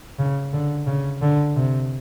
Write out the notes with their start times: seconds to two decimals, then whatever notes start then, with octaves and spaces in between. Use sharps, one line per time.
0.19 C#3
0.53 D3
0.87 C#3
1.22 D3
1.56 C3